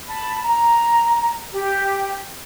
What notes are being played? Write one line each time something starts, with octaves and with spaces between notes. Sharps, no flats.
A5 B5
A#5
G4